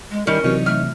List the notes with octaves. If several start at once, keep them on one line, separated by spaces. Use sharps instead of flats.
G#3
D#3 G3 C#4 A#4
C3 E3 F#3 D#4 C#5
A3 F6